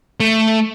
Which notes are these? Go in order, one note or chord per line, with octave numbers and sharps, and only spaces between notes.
A3